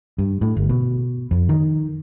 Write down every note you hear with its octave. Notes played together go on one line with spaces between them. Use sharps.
G2
A2
G1
B2
F2
D#3